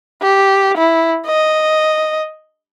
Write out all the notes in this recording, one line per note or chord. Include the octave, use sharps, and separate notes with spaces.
G4
E4
D#5